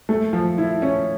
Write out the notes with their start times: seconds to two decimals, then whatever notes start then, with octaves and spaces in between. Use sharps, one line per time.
0.09 A3
0.33 F3
0.58 E4
0.82 C#4